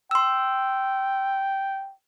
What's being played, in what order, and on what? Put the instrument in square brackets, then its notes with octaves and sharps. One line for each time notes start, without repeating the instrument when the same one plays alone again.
[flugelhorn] G5 [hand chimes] C6 E6